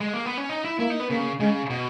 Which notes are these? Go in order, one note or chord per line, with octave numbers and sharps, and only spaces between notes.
G#3
A#3
B3
C#4
D#4
E4
A#3 E4
D#4
B3
C#3 A#3
C#3 G#3
B2